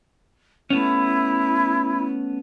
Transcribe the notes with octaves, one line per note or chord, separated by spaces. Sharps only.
A3 B3 C#4 E4